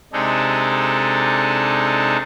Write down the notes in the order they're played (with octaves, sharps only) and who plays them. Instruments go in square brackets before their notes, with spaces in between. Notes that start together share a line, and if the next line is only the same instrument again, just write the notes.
[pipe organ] C3 G#3 D4 D#4 A4